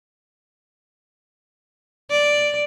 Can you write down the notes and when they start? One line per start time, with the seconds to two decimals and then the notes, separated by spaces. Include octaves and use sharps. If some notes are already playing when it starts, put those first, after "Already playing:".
2.11 D5